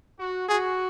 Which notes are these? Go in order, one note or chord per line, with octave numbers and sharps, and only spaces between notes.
F#4
F#4 G#4